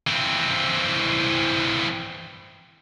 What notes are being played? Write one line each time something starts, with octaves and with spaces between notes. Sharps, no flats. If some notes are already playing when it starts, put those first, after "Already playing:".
E3 C4